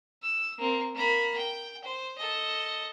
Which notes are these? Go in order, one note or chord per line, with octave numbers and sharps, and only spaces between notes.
E6
A#3 C4
A#3 B5
G5
C5
A4 D#5